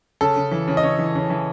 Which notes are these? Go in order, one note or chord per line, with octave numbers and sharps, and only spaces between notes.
C#3 A4
C#3
E3
C#3
D#5
C#3 C#5
E3
C#3
E3